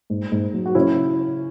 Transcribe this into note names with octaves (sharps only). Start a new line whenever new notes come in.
G#2
G#2
F#3
F#4
C#3 C#4 E4